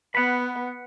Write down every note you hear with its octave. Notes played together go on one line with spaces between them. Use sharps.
B3 F#5 B5